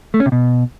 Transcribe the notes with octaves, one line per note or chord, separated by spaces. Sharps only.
A3
C#4
C3
B2